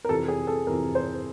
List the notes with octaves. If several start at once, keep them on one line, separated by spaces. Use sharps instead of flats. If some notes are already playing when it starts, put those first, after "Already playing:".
A#4
F2 C3 E3 A4
G#4
A4
F2 C3 E3 A#4
C5